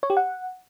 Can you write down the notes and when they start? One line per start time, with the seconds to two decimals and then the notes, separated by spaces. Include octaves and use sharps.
0.03 C#5
0.10 G4
0.17 F#5